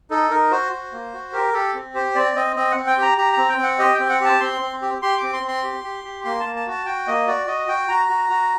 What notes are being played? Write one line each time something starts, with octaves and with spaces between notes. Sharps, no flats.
D#4 A4
D#4 A#4
F#4 C5
F#4
A#3
F#4
G4 A#4
G4 A4
C4
G4 C5
C4 D5
C4 D#5
C4 D#5
C4 F#5
G5
G4 A#5
G4 A#5
C4 A#5
G5
C4
F#5
G4 D#5
G5
C4
F#5
G4 A5
C4 C6
C4
G4
G4 C6
D6
C4
C6
C4
C6
G4
G4
G4
A#3 C6
A5
A#3
A5
F#4 A5
F#4 G5
A#3 D#5
F#4 D5
F#4 D#5
F#4 G5
F#4 A#5
F#4
F#4